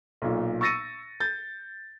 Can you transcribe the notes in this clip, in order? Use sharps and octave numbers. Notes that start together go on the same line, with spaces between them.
B1 A#2
C#6 E6 A6 A#6 C#7 D#7
G6 A6